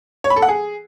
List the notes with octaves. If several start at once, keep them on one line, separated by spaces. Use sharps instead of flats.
C#5
B5
A4
F#5
G#4